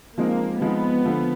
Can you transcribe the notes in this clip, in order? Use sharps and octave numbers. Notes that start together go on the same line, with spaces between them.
F3 G#3 A#3 C4 D#4
F3 G#3 B3 C4 D#4
D3 F3 A3